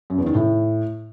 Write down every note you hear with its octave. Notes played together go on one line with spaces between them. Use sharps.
F#2
E2
D#3
A2